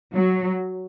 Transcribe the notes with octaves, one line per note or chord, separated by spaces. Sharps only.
F#3